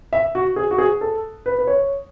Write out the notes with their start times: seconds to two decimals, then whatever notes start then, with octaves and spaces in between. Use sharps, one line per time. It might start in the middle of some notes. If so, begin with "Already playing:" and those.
0.13 E5
0.35 F#4
0.56 G#4
0.71 F#4
0.78 G#4
1.01 A4
1.46 B4
1.58 B4
1.67 C#5